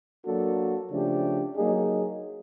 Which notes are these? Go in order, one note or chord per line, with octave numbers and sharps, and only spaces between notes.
F#3 A#3 D4 F#4 A4
C#3 F3 A3 D4 G4
F#3 A#3 D#4 G#4